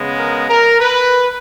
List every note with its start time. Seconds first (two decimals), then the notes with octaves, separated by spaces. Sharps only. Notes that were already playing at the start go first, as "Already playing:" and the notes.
Already playing: C#3 G#3 B3
0.19 A#4
0.49 A#4
0.80 B4